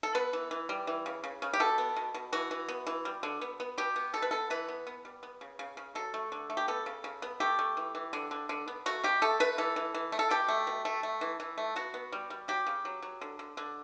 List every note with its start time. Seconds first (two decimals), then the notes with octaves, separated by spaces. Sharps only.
0.03 A4
0.15 B3 B4
0.33 E3
0.51 E3
0.69 G3
0.87 E3
1.06 C#3
1.24 C#3
1.42 C#3
1.53 G4
1.60 B2 A4
1.78 B3
1.96 B2
2.14 B2
2.33 E3 F#4
2.51 E3
2.69 B3
2.87 E3
3.05 G3
3.23 D3
3.41 B3
3.60 B3
3.78 B2 G4
3.96 B3
4.14 B2 A4
4.22 B4
4.31 B3 A4
4.50 E3 B4
4.68 B3
4.87 B3
5.05 G3
5.23 B3
5.41 C#3
5.59 C#3
5.77 C#3
5.95 F#3 A4
6.14 A3
6.32 D3
6.50 A3
6.57 G4
6.68 B3 A4
6.86 C#3
7.04 C#3
7.22 B3
7.40 A3 G4
7.59 A3
7.77 E3
7.95 E3
8.13 D3
8.31 D3
8.49 D3
8.68 B3
8.86 A3 F#4
9.04 B2 G4
9.22 A3 A4
9.40 A3 B4
9.58 E3 A4
9.76 E3
9.95 E3
10.12 A3
10.19 A4
10.31 B2 G4
10.48 A3
10.67 B2
10.85 A3
11.03 A3
11.21 E3
11.40 E3
11.58 A3
11.76 B3 F#4
11.94 B3
12.12 G3
12.30 G3
12.48 F#3 G4
12.67 C#3
12.85 F#3
13.03 F#3
13.21 D3
13.39 D3
13.57 D3